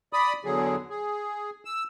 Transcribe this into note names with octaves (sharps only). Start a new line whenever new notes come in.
D5 B5 D#6
E2 D3 F#3 G#4
G#4
E6